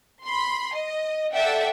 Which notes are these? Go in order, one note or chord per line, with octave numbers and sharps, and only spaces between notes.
B5 C6
D#5
A4 D5 E5 F#5 G5